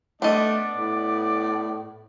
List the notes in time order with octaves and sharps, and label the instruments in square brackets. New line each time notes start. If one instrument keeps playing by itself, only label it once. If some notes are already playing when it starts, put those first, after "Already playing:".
[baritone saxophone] A3 [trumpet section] B3 D5 [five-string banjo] D4 D#5
[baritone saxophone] A2